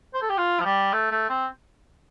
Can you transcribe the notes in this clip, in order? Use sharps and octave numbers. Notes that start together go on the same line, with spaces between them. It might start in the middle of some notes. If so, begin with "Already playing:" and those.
C5
A4
G4
F4
F3
G3
A3
A3
C4